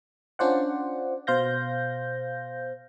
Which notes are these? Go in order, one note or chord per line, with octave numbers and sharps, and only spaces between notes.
C#4 D4 F4 C5 D5 F#5
B2 C5 F5 G6 A#6